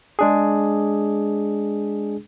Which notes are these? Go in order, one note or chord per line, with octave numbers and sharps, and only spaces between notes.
G#3 D4 G#4